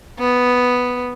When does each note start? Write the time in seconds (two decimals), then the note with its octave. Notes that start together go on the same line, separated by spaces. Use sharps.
0.20 B3